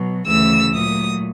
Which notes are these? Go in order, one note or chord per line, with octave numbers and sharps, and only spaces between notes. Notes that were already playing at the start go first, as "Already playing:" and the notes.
Already playing: B2 F#3
D2 C#3 E3 A3 E6
A#2 F#3 A3 D#6